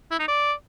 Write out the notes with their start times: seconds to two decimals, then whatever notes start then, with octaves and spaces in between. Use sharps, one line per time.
0.11 E4
0.20 D#4
0.28 D5